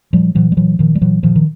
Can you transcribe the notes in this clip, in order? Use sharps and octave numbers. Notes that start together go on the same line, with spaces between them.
A#2 F3 G3
A#2 E3 F#3
G3
A#2 E3 F#3
A#2 D#3 F3
G3
A#2 E3 F#3
A#2 D#3 F3
D#3